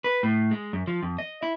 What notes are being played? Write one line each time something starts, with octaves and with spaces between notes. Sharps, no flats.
B4
A2
G#3
F#2
F3
F2
D#5
E4